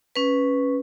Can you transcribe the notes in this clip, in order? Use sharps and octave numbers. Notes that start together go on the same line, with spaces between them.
C#4 B4